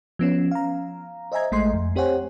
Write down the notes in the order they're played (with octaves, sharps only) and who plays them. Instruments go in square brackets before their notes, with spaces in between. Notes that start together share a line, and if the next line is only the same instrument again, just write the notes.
[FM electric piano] F3 B3 C#4
F5 A#5
C5 D#5 E5 G#5 A#5 G#6
A1 G#3 A3 D#5 C6 C7
F2
C4 G4 C5 C#5 F#5 G#5